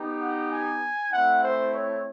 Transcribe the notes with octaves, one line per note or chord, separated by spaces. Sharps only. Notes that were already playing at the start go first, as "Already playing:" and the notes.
Already playing: B3 D#4 G4
F#5
G#5
A3 C4 E4 F#5
C5
C#5